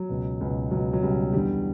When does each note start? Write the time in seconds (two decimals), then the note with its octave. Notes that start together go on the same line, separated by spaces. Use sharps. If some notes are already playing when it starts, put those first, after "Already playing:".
Already playing: F#3
0.09 C#2 B2
0.41 C#2 B2
0.71 C#2 B2 F#3
0.93 F#3
1.03 C#2 B2 G3
1.33 E2 D3 G3